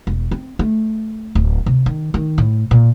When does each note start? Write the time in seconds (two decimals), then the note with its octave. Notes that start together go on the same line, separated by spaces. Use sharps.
0.07 E1
0.31 C4
0.59 A3
1.35 D1
1.66 C3
1.86 D#3
2.14 D#3
2.38 A2
2.71 A#2